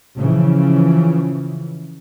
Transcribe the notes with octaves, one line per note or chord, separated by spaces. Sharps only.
C#3 E3 F3